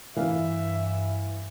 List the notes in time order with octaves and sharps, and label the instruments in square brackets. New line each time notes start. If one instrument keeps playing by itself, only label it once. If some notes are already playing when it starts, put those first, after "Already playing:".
[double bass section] G2 [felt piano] E3 F5 [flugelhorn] E5